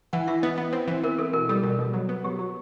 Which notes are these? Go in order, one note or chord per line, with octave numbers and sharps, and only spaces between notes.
E3 F#5
E3 E5
B3 D#5
B3
C4
E3
E3 A#4
E3 A4
B2 A#4
G3 A4
B2
B2
F#3
B3
F#3 G4
F#3